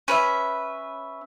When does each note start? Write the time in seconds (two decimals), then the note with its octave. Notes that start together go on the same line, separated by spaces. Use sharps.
0.08 C#4 B4 E5